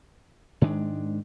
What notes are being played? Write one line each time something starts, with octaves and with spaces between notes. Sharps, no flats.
G#2 D#3 G#3 D4